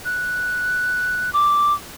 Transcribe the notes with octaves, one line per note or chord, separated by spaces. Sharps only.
F#6
D6